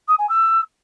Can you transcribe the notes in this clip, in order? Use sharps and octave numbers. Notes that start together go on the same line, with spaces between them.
D#6
G#5
E6